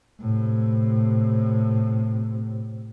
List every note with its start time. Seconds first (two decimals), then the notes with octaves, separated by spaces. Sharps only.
0.21 A2 C3